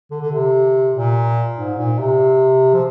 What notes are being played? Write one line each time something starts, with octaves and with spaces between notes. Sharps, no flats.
D3
D3
C3
A#2
G#2
A#2
C3
F3